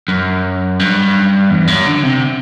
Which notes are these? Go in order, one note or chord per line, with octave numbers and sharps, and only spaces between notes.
F#2
G2
E2
F#2
D3
C3